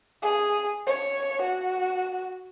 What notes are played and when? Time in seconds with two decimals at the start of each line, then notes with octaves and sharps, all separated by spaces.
0.22 G#4
0.86 C#5
1.42 F#4